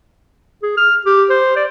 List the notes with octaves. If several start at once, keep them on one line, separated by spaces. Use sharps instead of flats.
G#4
F6
G4
C5
D5